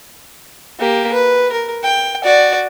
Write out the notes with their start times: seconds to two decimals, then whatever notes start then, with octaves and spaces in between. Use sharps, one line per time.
0.79 A#3 G4
1.13 B4
1.52 A#4
1.83 G5
2.24 F#4 D5